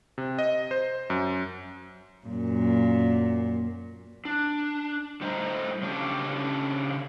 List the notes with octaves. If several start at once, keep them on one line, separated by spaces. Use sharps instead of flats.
C3
D#5
C5
F#2
F#2 A#2
D4
A2 G3 C5 D#5 F#5 A#5
C#3 C#4 D4 F#4 G4 A4